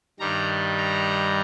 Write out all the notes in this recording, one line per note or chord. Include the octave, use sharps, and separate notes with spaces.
G2 D#3 G3 A#5
A#5